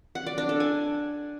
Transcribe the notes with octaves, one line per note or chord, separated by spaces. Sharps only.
F#5
D5
D4
A4
G#5